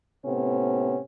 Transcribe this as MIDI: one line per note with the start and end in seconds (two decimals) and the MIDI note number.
0.24 0.98 45
0.24 0.98 48
0.24 0.98 59
0.24 0.98 61